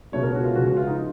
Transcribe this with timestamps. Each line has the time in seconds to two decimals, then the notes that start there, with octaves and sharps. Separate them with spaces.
0.12 C#2 B2 G#3 C#5
0.23 A#4
0.35 F#4
0.44 F4
0.55 C#2 C#3 F3 G#3 F#4
0.66 F#4
0.77 F4
0.87 D#4